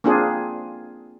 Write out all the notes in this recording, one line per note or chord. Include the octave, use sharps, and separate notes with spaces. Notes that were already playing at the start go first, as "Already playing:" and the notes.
A#3 C4 D4 F4 G#4